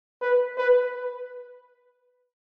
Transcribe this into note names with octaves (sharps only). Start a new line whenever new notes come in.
B4
B4